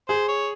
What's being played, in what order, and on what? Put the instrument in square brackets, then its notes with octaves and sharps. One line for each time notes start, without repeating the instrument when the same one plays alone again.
[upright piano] G#4 [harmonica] C5
[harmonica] C#5